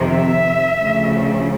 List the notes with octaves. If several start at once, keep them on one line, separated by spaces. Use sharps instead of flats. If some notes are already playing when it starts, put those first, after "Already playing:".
Already playing: F2 C3 D#3
E5
D2 C#3 F3